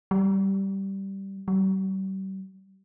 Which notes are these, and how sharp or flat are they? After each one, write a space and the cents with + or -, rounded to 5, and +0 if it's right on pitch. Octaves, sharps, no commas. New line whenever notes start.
G3 -10
G3 -40